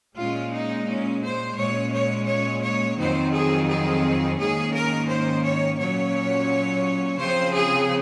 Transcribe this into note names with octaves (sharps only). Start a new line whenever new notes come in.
A#2 G#3 C#4 F4
D#4
C#4
C5
A#2 G#3 C#4 C#5
C#5
C#5
C#5
F2 D#3 F#3 C4 C5
G#4
G#4
G#2 D#3 A#3 C#4 G#4
A#4
C5
C#5
A#2 F#3 C#4 C#5
C#3 F3 C4 C5
G#4